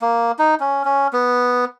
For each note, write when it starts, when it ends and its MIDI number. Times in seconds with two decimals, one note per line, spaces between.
0.02 0.32 58
0.39 0.55 63
0.60 0.83 61
0.85 1.07 61
1.13 1.65 59